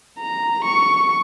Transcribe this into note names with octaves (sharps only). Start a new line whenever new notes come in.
A#5
C#6